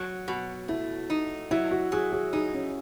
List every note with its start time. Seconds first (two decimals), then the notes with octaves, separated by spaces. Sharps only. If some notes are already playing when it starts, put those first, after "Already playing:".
Already playing: F#3
0.28 B2 F#4
0.68 A3 E4
1.10 D#4
1.51 F#3 E4
1.71 F#4
1.92 F#3 G#4
2.13 G#4
2.33 D#4 G#4
2.54 C#4